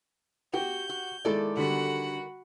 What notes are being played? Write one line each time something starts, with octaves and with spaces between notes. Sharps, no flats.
F#4 G4 G5 G6
F#4
D#3 G#3 E4 A4 D5
D3 G3 F#4 F#5 B5